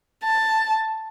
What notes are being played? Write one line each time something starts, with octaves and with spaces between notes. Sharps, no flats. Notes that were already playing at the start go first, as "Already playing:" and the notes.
A5